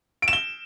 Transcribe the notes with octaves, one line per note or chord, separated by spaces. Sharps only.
D7
E7
G7